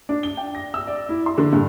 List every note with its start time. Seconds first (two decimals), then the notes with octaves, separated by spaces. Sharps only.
0.09 D4
0.23 G7
0.37 G5
0.55 A#6
0.74 E6
0.87 D5
1.09 E4
1.26 C6
1.38 D3
1.53 G2